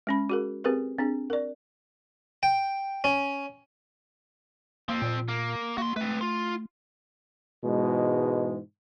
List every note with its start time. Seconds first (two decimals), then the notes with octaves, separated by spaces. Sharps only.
0.07 G#3 C#4 B5
0.29 F#4 G#4 A#4
0.64 C4 G4 G#4 A#4 B4
0.98 C4 D4 G#4
1.30 A#4 D5
2.43 G5
3.04 C#4
4.89 F3 A#3 C4
5.02 A#2
5.28 A#3
5.78 A#3 F#4 C6
5.96 A3 C4 B4
6.21 F4
7.64 G#2 B2 E3 G#3